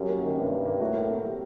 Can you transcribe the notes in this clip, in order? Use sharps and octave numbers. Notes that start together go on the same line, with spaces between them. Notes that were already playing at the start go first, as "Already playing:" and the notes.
Already playing: F#2 G3
A#3
D#3
G2 C3
G3
A#3
A2 F#4
A#4
C4
G3